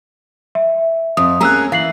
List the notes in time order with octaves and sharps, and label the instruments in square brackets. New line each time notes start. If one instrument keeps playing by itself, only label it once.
[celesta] E5
[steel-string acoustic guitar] F2 [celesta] D#6
[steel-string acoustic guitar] A#3 C#4 G#4 [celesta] A#5 E6 F#6
[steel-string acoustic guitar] E3 [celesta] F5 C7 F#7